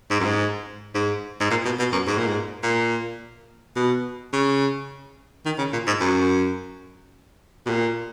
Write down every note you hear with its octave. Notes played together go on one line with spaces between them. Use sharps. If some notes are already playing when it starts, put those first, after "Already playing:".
G#2
F#2
G#2
G#2
G#2
A#2
B2
B2
F#2
G#2
A#2
G#2
A#2
B2
C#3
D#3
C#3
A#2
G#2
F#2
B2
A#2